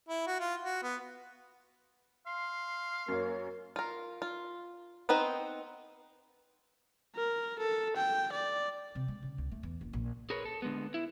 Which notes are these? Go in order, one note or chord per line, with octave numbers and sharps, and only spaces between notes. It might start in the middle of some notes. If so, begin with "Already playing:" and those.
E4
F#4
F4
F#4
B3
F5 C6
F#2 A#3 C#5
F4 A#4
F4
B3 C4 D#4 B4 C5
A#4
A4
G5
D5
C3
G#3
C#3
C#2
A3
E2
F#1
A#1
G#4 A#4 B4 C#5
A4
D3 G#3 B3
E4